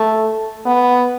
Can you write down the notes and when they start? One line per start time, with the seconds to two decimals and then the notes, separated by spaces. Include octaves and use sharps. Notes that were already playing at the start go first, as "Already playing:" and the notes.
Already playing: A3
0.66 B3